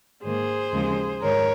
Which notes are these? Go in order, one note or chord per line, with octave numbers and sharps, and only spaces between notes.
G#2 D#3 A#3 G#4 C5
D#2 C#3 F3 G#3
G#2 D#3 A#4 C#5